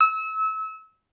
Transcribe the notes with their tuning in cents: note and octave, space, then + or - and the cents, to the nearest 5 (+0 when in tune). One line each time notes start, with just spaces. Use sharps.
E6 -30